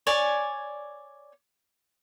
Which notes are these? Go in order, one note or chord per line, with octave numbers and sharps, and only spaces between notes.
C#5 D5 G#5